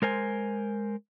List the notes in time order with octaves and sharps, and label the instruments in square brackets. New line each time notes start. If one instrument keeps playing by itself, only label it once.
[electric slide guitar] G#3 A#4 C5 G#5